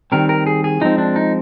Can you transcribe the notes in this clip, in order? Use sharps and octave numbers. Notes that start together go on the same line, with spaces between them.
D#3 G3 C4 A#4
A#4
G#4
G#4
F3 G#3 C4 D#4
D4
D#4